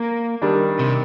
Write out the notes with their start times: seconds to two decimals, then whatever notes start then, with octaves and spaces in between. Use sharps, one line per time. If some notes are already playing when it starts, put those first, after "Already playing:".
Already playing: A#3
0.42 D#3 G3 D4
0.79 C3